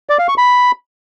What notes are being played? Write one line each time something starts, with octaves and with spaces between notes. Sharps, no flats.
D5
F5
C#6
B5